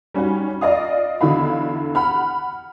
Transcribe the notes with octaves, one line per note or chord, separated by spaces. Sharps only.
G3 C#4 D#4 F#4
F4 D5 D#5 F5 D#6
E2 D3 E4 F#4 F5 B5
F#5 B5 F6